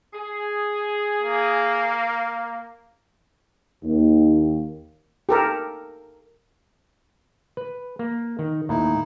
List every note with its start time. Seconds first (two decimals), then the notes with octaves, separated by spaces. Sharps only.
0.13 G#4
1.22 A#3
3.84 D#2
5.29 G4 A4 A#4
7.57 B4
7.99 A#3
8.39 D#3
8.69 D#2 A2 D#4 E4